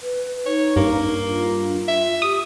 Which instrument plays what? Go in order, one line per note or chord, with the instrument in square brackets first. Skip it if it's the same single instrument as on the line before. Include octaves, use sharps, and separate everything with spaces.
[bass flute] B4
[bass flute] D#4 [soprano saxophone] C#5
[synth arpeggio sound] G2 [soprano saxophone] A#3
[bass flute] F4
[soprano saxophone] E5
[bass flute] G4 [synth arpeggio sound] D#6